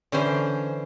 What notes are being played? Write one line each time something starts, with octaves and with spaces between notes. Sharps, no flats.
D3 E3 C#4 C5